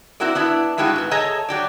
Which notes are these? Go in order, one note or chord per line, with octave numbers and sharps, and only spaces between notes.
C4 E4 F#4 A#4 D5
B3 D4 E4
G2 G#3 E4 F#4 G4
G#2 B3
G#4 A4 C#5 D#5 A5 A#5
F#3 G4 D5